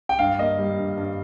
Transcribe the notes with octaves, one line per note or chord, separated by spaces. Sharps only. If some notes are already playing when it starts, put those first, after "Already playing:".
G5
G2 F5
A#3 D#5
G3
G2
G2